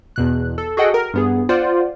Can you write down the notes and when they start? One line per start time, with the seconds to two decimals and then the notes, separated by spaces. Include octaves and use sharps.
0.16 E2 B2 F#6
0.58 A4
0.77 F#4 G#4 A4 D#5 F#5 G5
0.94 A#4
1.14 G2 B3 G#4
1.49 F4 C5 D5 F#5